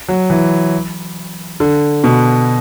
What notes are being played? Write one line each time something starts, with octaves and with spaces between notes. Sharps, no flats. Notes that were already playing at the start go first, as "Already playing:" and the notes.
F#3
E3
D3
B2